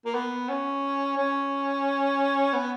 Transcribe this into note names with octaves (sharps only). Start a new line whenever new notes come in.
A#3
B3
C#4
C#4
B3